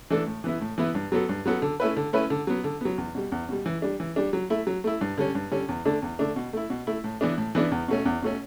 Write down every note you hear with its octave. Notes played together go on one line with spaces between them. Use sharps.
E3 A3 D4 A4
A2
E3 B3 E4
A2
E3 B3 E4
G2
F#3 B3 F#4 A4
G2
F#3 B3 F#4 A4
D3
A3 C#4 E4 B4
D3
A3 C#4 E4 B4
D3
F#3 B3
D3
F#3 B3
E2
B2 G3
E2
B2 G3
E3
G3 D4
E3
G3 D4
F#3
A3 E4
F#3
A3 E4
G2
D3 G3 C#4
G2
D3 G3 C#4
E2
D3 A3 D4
E2
D3 A3 D4
B2
A3 E4
B2
A3 E4
A2
E3 B3 D4
A2
E3 B3 D4
E2
B2 A3 C#4
E2
B2 A3 C#4